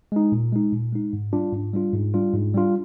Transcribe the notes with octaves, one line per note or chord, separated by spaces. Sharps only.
G#3 D#4
A#2
G#3 D#4
A#2
G#3 D#4
G#2
G3 D4 F4
G#2
G3 D4 F4
G#2
G3 D4 F4
G#2
G3 D4 F4